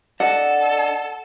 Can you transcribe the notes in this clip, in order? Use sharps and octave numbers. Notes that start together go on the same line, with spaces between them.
D4 A4 D5 D#5 F#5